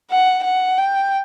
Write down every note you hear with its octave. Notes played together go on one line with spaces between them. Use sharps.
F#5
F#5
G5